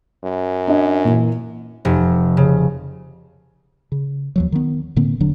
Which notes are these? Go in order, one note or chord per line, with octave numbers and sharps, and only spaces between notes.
F#2
D4 D#5
A#2 E3
F1
C#3
C#3
D#2 F3 F#3
D#3 B3
A2 D3 A#3 C4
E1 D3 F#3 D4